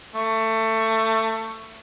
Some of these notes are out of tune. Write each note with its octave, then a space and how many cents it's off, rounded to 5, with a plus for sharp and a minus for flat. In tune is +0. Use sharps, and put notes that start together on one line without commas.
A3 +20